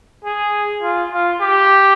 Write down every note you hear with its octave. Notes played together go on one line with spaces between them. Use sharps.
G#4
F4
F4
G4